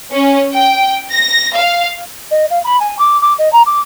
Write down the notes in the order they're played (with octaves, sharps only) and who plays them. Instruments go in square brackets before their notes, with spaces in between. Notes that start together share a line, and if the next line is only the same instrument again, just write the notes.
[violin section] C#4
G5
A#6
F5
[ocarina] D#5
F5
B5
G#5
D6
D6
D#5
A#5
D6